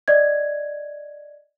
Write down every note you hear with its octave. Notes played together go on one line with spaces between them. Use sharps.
D5 D#5 G#6